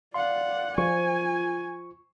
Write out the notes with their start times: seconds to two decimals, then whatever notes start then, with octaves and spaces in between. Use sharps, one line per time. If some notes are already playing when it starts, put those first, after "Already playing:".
0.14 D5 F5 F#5 C6
0.78 F3 G#5 C#6